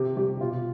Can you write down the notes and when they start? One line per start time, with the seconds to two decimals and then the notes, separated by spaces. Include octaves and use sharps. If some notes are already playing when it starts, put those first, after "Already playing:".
Already playing: C3 G4
0.16 G3 G4
0.41 B2 F4